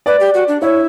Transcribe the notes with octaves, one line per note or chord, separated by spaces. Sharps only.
B4 D5
G4
F#4
D4
E4 C#5